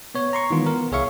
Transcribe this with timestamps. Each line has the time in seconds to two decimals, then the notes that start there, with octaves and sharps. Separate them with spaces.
0.15 B3 C#5
0.33 A#5 C6 C#6
0.50 D#3 E3 G#3 B3 D#4 F4
0.64 B3 A#4
0.91 C2 G#4 C#5 E5 F5 C#6